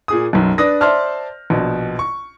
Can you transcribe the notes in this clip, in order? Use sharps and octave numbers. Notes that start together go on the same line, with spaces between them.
A#2 G#4 D#6
B1 F#2
D4 B4 D5 D#6 A#6
C5 D5 E5 A5 F6
A#1 B2
C#6